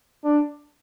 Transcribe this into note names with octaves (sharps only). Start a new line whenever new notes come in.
D4